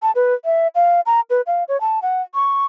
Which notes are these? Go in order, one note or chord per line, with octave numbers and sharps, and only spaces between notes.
A5
B4
E5
F5
A#5
B4
F5
C#5
A5
F#5
C#6